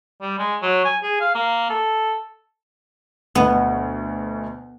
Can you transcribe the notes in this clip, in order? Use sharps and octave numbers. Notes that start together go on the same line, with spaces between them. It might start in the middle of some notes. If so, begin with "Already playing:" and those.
G3
G#3
F#3
G#5
G#4
F5
A#3
A4
D2 B2 B3